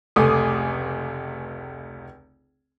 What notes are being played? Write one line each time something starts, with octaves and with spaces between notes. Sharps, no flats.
F1 C#2 A3 G#5 D6 D#6